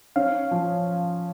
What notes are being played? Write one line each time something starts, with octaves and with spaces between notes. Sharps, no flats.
C#4 F5
F3